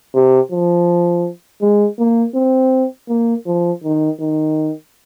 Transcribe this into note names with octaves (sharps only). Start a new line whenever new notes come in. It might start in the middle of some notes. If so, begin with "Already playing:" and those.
C3
F3
G#3
A#3
C4
A#3
F3
D#3
D#3